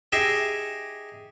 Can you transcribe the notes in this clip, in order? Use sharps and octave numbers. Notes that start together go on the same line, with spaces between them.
D#4 G4 G#4 E5